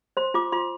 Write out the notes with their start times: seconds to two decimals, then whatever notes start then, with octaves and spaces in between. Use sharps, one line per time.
0.17 C5 C6
0.34 F4 D6
0.52 F4 C6